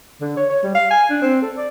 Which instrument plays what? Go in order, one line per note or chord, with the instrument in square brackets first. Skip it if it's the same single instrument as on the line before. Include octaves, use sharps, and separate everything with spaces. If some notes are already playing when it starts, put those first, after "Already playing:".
[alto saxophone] D3
C#5
C#5
G3
F5
G#5
D4
C4
A4
D5